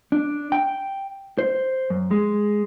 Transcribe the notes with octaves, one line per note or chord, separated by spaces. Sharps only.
D4
G5
C5
F#2
G#3